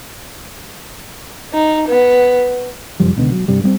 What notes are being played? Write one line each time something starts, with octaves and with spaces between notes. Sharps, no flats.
D#4
B3
F1 F#2 F3 G3
C#2 B2 D3 B3
F#3
G2 C3 G3
G3 B3 C4